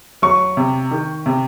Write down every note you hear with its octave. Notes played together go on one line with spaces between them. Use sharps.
F#3 C#6
C3
D#3
C3